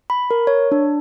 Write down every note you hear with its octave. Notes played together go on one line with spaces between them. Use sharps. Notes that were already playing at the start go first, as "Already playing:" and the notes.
B5
A#4
C#5
D4